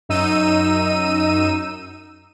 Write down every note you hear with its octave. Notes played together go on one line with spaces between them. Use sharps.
F#2 D#4 E6 D#7